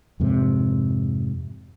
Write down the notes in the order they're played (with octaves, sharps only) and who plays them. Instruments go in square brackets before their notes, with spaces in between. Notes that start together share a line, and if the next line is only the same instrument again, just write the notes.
[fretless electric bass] F2 G#2 C3